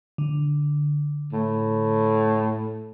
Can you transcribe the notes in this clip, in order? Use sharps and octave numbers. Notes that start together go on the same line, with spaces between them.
D3
A2